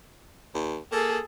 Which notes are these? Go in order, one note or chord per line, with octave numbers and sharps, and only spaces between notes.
D#2
A#3 G#4 A4